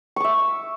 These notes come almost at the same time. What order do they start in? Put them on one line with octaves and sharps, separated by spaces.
C#6 D6 E5